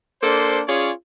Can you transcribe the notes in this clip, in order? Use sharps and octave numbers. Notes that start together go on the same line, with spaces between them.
A#3 D4 A4 C5
C#4 F4 G#4 C#5 D5